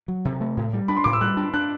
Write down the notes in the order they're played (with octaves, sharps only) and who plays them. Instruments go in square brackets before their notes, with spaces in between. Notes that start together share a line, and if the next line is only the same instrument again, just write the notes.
[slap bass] F#3
C3
A3
A2
G3
[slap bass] D4 [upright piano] B5
[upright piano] C6
[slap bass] A2 [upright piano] D6
[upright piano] E6
[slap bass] G3 [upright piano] F#6
[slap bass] D4
[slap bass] D4 [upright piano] F#6